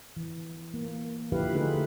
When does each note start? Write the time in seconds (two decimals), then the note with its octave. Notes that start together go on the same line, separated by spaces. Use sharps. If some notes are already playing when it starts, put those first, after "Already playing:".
0.17 E3
0.74 A#3
1.32 D3 F3 E4 G4 B4 F5
1.54 D3 A3 D#4 F4 G#4 B4